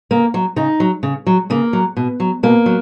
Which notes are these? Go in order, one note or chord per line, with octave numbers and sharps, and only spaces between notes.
C#3 A#3
F#3
C#3 D#4
F#3
C#3
F#3
C#3 A#3
F#3
B2
F#3
B2 A#3
F#3